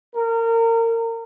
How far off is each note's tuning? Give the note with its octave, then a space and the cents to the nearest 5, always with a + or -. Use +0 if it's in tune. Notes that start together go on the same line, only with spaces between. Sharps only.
A#4 -30